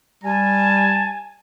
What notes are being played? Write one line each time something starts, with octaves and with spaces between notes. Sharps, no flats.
G3 G#5 A5